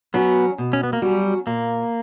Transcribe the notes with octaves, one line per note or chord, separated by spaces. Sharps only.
F#3 B3 C#4 F#4
B2
C#4
B3
A#3
F#3 G3 C#4 F#4
A#2 A#3